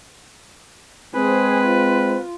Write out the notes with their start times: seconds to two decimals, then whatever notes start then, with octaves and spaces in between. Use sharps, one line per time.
1.15 G#3 C4 G#4 B4 C5
1.67 F4